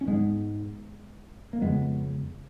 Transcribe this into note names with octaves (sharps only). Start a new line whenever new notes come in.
C#4
G#2 G#3 B3
A#3
F2 C#3 G#3 B3